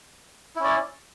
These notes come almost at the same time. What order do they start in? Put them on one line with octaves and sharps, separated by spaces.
E4 C#4 D5